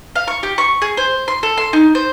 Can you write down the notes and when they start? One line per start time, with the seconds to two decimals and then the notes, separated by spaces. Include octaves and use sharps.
0.16 F5
0.28 C#6
0.43 G4
0.58 C#6
0.82 G#4
0.97 C5
1.28 C6
1.43 A4
1.58 C6
1.73 D#4
1.95 C5